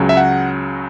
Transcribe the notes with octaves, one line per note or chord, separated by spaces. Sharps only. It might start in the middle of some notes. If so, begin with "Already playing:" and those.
Already playing: C#2 C#3 F#3
E5
F#5